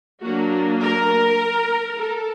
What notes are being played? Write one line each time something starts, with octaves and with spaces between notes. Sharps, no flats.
F#3 A#3 D4 F#4
A#4
A4